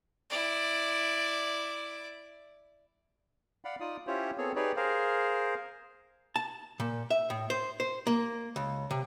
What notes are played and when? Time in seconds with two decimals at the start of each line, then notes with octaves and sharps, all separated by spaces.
0.30 E4 D5
3.65 D5 F5 F#5 B5
3.80 D#4 F4 D5 D#6
4.07 C#4 E4 F4 G4 C5 C#5
4.38 B3 C4 G#4 A4 C#5
4.56 D#4 G4 G#4 B4 C#5 D5
4.76 G#4 A#4 C5 F5
6.36 A5
6.80 A#2
7.10 E5
7.30 A2
7.50 C5
7.80 C5
8.07 A#3
8.56 C#2
8.91 C3